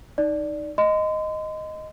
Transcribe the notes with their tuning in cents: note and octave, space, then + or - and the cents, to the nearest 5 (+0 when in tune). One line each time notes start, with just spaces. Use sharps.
D#4 -5 D5 +0
D#5 +0 C6 -40